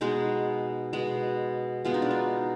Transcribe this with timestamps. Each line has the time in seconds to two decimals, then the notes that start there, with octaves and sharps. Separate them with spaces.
0.01 B2 G#3 B3 D#4
0.93 B2 G#3 B3
1.85 B2 G#3 B3 F4
1.94 D#4
2.02 D4
2.11 D#4